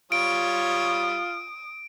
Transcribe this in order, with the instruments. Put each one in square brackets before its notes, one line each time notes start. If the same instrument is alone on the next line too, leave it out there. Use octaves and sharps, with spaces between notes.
[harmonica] G3 C#5 [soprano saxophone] F4 [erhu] D#6 [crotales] D7